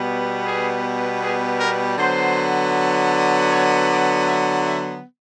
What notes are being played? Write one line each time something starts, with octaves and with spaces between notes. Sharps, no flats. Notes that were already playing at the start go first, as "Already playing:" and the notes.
Already playing: B2 G3 B3
G#4
G#4
A#4
D3 F#3 B3 C5
C#5
D5
E5
E5